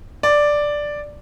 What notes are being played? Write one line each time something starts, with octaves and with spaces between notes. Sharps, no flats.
D5